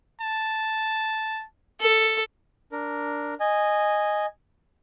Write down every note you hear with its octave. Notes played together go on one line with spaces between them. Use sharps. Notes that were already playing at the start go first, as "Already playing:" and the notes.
A5
A4
D4 A#4
D#5 G#5